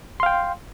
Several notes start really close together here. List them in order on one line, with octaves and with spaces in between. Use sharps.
C6 F5 G5